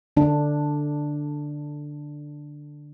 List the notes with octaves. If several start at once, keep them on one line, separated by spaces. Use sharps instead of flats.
D3 D4